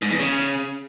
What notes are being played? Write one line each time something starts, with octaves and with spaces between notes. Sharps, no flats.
G#2
E2
C#3